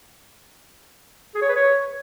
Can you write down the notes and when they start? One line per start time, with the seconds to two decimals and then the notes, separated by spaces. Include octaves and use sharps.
1.35 G#4
1.42 C#5
1.49 B4
1.56 C#5